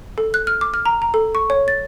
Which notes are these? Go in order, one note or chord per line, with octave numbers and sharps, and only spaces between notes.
A4
F#6
F6
D6
F6
A#5
A#5
A4
C#6
C#5
A6